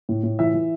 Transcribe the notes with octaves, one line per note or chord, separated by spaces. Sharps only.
A2
A2
E3 E5
E3